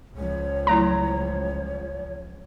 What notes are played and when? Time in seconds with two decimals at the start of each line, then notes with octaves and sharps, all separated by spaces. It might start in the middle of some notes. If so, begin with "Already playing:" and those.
0.16 C#2 F3 C#5
0.67 F#3 A3 E4 A#5